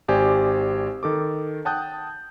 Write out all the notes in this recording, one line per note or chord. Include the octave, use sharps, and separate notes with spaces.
G#1 G4 C5 D5 G#5
D#3 A4 D6
F#5 G5 A5 D#6 F#6 G6